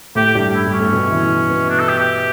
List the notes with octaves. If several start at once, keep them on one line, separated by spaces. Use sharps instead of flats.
A2 A3 G4
G2 G3
E4
G2 G3
C#4
A2 A3
B2 B3
E3 E4
B2 B3
D4
A4
G4
G4